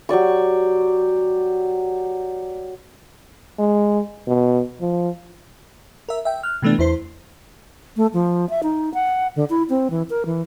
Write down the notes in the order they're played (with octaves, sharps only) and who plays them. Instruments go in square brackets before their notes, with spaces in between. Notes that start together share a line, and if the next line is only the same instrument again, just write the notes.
[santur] F#3 G4 D5 C#6
[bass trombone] G#3
B2
F3
[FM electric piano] A#4 E5
E5 G5
F6 F#6
C3 E3 A3 B3 D4
E2 E4 C5 C7
[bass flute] A3
F3
E5
D#4
F#5
D3
E4
C4
E3
A#4
E3